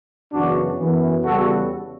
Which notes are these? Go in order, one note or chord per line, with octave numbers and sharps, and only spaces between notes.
F#2 C#3 E3 B3 D4 F#4
F#2 E3 B3
E2 C#3 G3 B3 F#4 A4